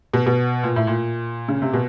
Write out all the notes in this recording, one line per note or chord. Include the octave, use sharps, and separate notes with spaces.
B2
B2
A#2
A2
A#2
C#3
C3
B2